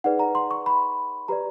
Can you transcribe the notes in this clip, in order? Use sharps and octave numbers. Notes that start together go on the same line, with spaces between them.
D#4 G#4 B4 D5 F#5
A#5
C6
C#6
B5
G4 B4 D5 A#5